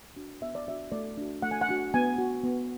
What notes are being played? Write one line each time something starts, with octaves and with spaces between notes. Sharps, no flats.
D4 F#4
B3 E5
D5
D4 F#4 E5
A3 D5
D4 F#4
A3 F#5
G#5
F#5
D4 F#4
B3 G#5
F#4
B3